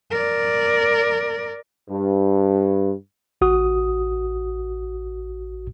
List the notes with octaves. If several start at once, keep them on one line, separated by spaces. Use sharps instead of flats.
A#4 D5
G2
A1 F#4 D#6